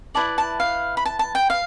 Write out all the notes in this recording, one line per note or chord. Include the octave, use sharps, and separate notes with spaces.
E4 B4 D5 A5
A5
F5
B5
A5
A5
G5
F5